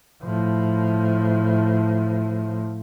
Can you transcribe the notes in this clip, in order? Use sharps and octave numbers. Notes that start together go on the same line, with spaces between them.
A2 F3